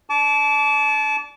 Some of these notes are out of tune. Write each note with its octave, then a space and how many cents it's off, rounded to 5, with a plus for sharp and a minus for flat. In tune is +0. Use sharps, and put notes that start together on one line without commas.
D4 +0 A5 -25 D6 -30